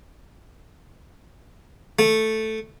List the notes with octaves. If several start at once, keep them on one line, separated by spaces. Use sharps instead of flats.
A3